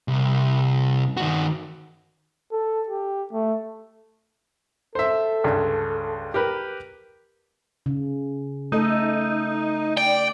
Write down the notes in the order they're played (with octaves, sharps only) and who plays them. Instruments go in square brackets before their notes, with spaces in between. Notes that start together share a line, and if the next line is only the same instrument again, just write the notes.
[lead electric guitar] C2
D#3 F#4
[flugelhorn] A4
G4
A3
[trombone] A4 [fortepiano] C5 E5
[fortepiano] C#2 G2
G4 A#4 B4
[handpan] C#3
[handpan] A3 A4 D#5 [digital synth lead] D#4
[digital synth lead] D5 [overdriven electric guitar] G5